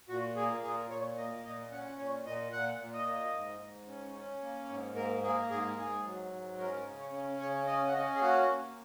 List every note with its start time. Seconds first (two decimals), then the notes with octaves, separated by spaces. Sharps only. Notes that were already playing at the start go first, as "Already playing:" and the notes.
0.09 A#2 F#4
0.36 A#3 G#4
0.63 A#2 G#4
0.90 A#2 C#5
1.17 A#3 D#5
1.44 A#2 D#5
1.71 C#4 F#5
1.99 A#2 C#5
2.25 A#2 D#5
2.52 A#2 F#5
2.80 A#2
2.94 D#5
3.07 A#3
3.34 G#2
3.60 G#2
3.88 C#4
4.15 C#4
4.42 A#3
4.69 G#2
4.96 A#3 A#4
5.23 A#3 G#4
5.50 G#2 G#4
5.77 G#2 G#4
6.04 F#3
6.31 G#2
6.59 C#4 A#4
6.85 C#3
6.99 C#5
7.13 C#4
7.39 C#3 C#5
7.67 C#4 D#5
7.88 F#5
7.93 C#4 D#5
8.15 G#4
8.21 A#3 F#4
8.48 A#3